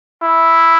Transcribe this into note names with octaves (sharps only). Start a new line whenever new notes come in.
E4